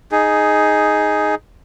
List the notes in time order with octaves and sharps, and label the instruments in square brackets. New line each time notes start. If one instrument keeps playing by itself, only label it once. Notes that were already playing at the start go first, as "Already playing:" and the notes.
[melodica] D#4 G#4